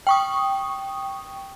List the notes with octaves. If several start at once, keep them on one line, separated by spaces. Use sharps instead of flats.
G5 C#6 D#6